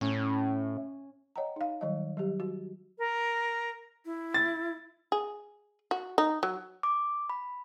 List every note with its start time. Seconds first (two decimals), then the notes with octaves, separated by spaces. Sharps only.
0.01 A2 C#4
1.36 C#5 D#5 F#5 G5 A#5
1.56 D#4 F5
1.81 D#3 F#3 G3 D5 D#5
2.17 F#3 G3 G4
2.40 F#4
2.99 A#4
4.05 E4
4.34 A6
5.12 G#4
5.91 F#4
6.18 D#4
6.43 F#3
6.83 D6
7.30 B5